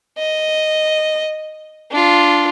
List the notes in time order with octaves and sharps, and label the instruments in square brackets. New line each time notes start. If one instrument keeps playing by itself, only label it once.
[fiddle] D#5
D4 F4